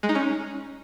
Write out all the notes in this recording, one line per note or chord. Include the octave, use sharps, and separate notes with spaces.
G#3
D#4
C#4